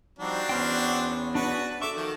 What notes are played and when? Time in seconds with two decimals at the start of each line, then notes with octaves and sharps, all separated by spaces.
0.19 F3 G3 C4 D4 D#4 F#4
0.49 E2 B3 C#4 G5 C6 F6
1.35 D4 F#4 B4 D5
1.82 F#4 A4 E5 C#6 D6
1.95 D#3 F3